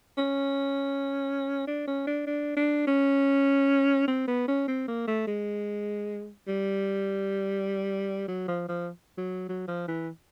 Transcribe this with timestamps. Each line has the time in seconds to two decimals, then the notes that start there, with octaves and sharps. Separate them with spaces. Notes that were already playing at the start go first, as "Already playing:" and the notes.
0.18 C#4
1.67 D4
1.88 C#4
2.07 D4
2.27 D4
2.57 D4
2.87 C#4
4.08 C4
4.28 B3
4.48 C#4
4.68 C4
4.88 A#3
5.08 A3
5.27 G#3
6.48 G3
8.28 F#3
8.48 F3
8.69 F3
9.18 F#3
9.49 F#3
9.68 F3
9.88 E3